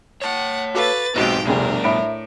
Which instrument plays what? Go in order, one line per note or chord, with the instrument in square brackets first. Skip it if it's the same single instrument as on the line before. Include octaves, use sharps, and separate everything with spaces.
[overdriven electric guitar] C#5 A5 [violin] F#5
[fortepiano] F#4 A4 F5 [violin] B4 A6 [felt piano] D6
[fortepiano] B1 G#2 B2 [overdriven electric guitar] C4 D#4 [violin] G4 G5
[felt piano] F1 D2 [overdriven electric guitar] G2 B2 [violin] D4 A#4 [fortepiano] G#4
[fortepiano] A2 [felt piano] E5 B5 D7